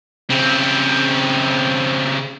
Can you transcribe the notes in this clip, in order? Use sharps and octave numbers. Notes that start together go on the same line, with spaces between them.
C#3 C4